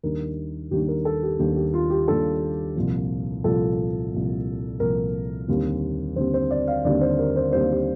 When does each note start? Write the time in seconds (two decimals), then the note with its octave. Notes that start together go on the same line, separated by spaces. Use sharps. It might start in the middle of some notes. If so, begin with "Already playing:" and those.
0.03 D#2 D#3 G3 D4 A#4
0.71 D#2 D#3 G3 D4 G4
0.88 A#4
1.05 A4
1.23 G4
1.39 D#2 D#3 G3 D4 G4
1.56 G4
1.74 F4
1.90 G4
2.08 D#2 D#3 G3 D4 A4
2.76 C2 A#2 F3
3.44 C2 A#2 F3 A4
4.13 C2 A#2 F3
4.80 C2 A#2 F3 A#4
5.48 D#2 D3 G3 C4
6.16 D#2 D3 G3 C4 C5
6.34 C5
6.51 D5
6.67 F5
6.85 D#2 D3 G3 C4 D5
7.01 C5
7.19 A#4
7.36 C5
7.53 D#2 D3 G3 C4 C5
7.70 G4